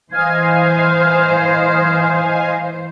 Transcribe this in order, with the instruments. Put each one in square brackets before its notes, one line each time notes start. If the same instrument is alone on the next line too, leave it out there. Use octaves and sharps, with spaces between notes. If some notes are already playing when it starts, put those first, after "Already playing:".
[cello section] E3 C5 [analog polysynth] D#5 F5 G#5